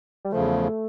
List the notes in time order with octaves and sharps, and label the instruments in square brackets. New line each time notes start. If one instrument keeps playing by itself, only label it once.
[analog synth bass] G3
[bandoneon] E2 C#3 F3 [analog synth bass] A3